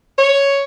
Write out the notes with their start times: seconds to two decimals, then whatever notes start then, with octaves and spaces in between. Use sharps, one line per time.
0.19 C#5